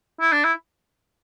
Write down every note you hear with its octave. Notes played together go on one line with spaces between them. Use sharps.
E4
D4
E4